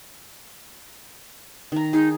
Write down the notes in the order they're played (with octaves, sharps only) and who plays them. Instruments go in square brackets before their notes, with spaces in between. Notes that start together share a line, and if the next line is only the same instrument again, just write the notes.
[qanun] D#3 A#5
[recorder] D#4 [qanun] G#4